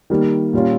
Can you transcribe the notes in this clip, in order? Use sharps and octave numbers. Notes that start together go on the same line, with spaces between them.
D#3 G3 A#3
A#2 G3 C#4 F4